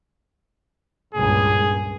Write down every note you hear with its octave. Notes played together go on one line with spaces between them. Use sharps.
C#2 G2 A#2 G#4